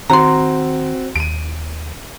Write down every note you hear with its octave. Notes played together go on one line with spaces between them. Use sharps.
D#3 C4 F#4 A#5 C6
D#2 D7 D#7